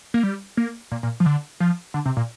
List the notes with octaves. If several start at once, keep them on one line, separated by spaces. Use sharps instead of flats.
A#3
G3
A#3
A#2
A#2
F3
D3
F3
D3
C3
A#2